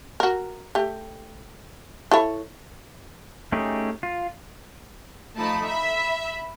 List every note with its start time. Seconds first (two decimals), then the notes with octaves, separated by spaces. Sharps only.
0.20 F#4 A#4
0.75 A3 G4
2.11 E4 A4 C#5
3.52 A3 C#4 D#4 G4 G#4
4.03 F4
5.37 F3 A3 D#4 A5 B5
5.66 E5 B5